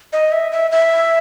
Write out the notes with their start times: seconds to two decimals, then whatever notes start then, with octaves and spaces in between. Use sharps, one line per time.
0.13 D#5
0.32 E5
0.52 E5
0.71 E5